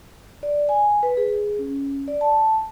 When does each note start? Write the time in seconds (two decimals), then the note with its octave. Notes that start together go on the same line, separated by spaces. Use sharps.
0.43 D5
0.69 G#5
1.03 B4
1.17 G#4
1.59 C#4
2.08 D5
2.21 A5